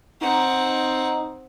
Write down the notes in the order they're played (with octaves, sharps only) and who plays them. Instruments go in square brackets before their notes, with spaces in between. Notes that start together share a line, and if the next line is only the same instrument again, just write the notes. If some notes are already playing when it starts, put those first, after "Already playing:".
[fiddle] C4 F#5 [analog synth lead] D#4